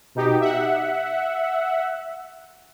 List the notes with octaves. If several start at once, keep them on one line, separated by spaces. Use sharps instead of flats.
B2 D#4 G4
E5 F#5